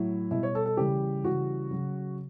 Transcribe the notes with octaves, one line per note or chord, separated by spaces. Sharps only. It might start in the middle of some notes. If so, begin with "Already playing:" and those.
Already playing: A2 F#3 E4
B2 G3 E4
C#5
A4
A4
C#3 E3 G3 G4
C#3 E3 G3 F#4
C#3 F#3